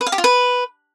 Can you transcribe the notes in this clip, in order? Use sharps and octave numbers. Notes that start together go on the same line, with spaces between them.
B4
F5
G4
F4
B4